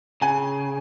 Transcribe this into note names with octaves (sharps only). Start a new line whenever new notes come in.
C#3 G#5